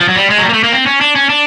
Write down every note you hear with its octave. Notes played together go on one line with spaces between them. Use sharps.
F3
F#3
G3
G#3
F#3
G3
A#3
A3
A#3
C4
C#4
D4
C#4
D4